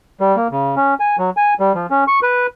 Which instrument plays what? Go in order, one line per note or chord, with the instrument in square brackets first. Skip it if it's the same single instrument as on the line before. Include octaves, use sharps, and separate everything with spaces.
[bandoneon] G3
A#3
C#3
C#4
G#5
F#3
G#5
G3
F3
C#4
C#6
B4